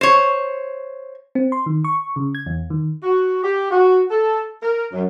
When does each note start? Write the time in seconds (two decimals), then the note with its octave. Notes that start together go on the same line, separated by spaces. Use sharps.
0.01 C5 C#5
1.35 C4
1.52 C6
1.66 D#3
1.84 C#6
2.16 C#3
2.35 G#6
2.46 E2
2.70 D#3
3.03 F#4
3.43 G4
3.71 F#4
4.10 A4
4.62 A#4
4.92 F#2